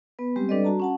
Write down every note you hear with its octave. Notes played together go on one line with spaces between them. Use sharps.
B3 B4
G3 G#3 C4 G4
G3 D4 A4 B4 D5 D#5
F#4 A5 A#5
C#4 F#5 A5